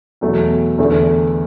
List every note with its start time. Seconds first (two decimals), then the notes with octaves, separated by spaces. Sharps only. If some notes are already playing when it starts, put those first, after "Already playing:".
0.21 E2 B2 F#3 A3
0.78 E2 D3 A3